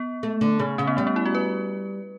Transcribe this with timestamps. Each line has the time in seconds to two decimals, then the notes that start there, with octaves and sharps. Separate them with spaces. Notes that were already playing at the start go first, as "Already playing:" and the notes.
Already playing: B3
0.23 A3
0.41 D3
0.59 C#3 A3
0.78 C#3 C#4
0.87 B3
0.97 G3 A3
1.07 B3
1.16 E4
1.25 F#4
1.35 B4